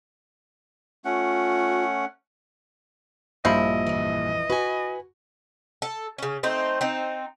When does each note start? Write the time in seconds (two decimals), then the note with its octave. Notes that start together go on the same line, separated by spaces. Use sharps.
1.05 A3 C#4 F4 F#5
3.45 A#1 G2 A#2 F3 E4 D#5
3.87 F2 E3
4.50 F#4 B4 G#5
5.82 A4
6.18 C#3 C#4
6.43 A3 C4 D#4 C5
6.81 C4 D#4